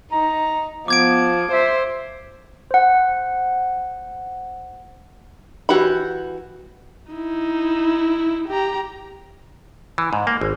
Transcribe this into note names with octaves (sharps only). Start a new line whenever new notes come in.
D#4 A#5
F3 B3 D6 G#6 D7
C5 E5
C5 F#5
E3 F#4 G4 B5
D#4 E4
G4 A#5
E3
G#2
A#3
G#1